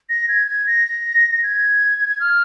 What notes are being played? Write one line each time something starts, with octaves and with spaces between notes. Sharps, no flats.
A#6
G#6
G#6
A#6
G#6
F6